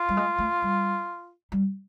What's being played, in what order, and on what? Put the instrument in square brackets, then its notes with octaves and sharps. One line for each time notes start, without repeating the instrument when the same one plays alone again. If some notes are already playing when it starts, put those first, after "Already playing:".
Already playing: [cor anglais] F4
[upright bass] G3
G#3
A3
G3
G3